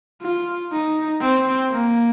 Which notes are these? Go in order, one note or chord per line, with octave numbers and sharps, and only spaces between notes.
F4
D#4
C4
A#3